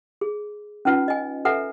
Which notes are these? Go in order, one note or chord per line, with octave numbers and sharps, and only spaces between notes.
G#4
C#4 D#4 F4 B4 F#5
D#5 G#5
A4 B4 E5 F#5 G#5 A#5